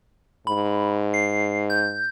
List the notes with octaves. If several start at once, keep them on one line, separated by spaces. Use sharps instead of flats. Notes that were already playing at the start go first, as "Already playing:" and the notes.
G#2 B5
C7
G6